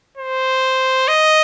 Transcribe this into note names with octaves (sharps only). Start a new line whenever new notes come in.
C5
D#5